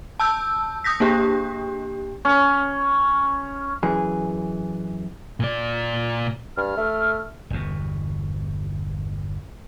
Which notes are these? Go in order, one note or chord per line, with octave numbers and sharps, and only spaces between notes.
A5 E6 G6
D#6 G6 A#6 B6
A#3 D4 G4
C#4
F#2 E3 G#4
A#2 D5
G2 F6
A3
G1 E2 B2